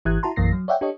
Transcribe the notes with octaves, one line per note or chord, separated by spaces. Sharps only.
G#1 E3 E4 G4 F#6 G#6
E4 F#4 A5 A#5 C6
A#1 F#2 E3 A#3 A#6 C7
F#3
C#5 D5 E5 F#5 G5
D4 G4 A4 C#5 D#5